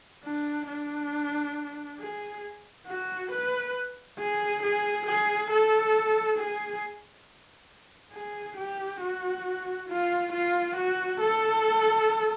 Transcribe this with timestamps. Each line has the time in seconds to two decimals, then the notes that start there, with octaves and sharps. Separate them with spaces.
0.24 D4
0.67 D4
1.99 G#4
2.87 F#4
3.31 B4
4.18 G#4
4.62 G#4
5.06 G#4
5.50 A4
6.38 G#4
8.13 G#4
8.57 G4
9.01 F#4
9.89 F4
10.32 F4
10.76 F#4
11.20 A4